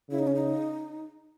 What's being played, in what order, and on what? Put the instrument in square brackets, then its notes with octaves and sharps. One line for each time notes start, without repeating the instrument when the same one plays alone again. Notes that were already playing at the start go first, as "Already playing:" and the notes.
[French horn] C#3 [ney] E4
[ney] D#4
C#4
D#4